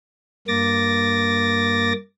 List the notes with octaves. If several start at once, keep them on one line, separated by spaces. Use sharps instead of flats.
G2 A#3 D6 A6 A#6